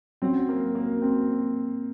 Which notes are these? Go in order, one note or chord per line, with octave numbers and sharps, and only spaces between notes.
F#3 C4 C#4 F#4
A#3
A#3
C4